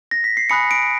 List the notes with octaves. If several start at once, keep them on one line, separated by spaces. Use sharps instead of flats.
A#6
B6
C7
G#5 B5 D#6 F#6 C#7
D7